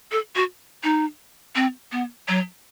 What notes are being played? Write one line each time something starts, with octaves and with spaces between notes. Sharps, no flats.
A4
F#4
D#4
C4
B3
F#3